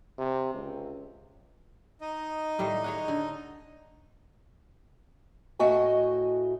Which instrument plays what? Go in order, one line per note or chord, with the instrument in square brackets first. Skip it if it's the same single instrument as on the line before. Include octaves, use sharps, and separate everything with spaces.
[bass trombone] C3
C#2
[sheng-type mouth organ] D#4 D#5
[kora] A2 D#3 G3
G#4 C#5 F#5
D3
[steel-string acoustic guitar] A2 A3 F#4 D#5 G#5